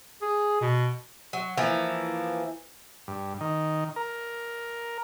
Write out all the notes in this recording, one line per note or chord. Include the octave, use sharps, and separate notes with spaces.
G#4
B2
F#3
E3 F3 A#3
G2
D#3
A#4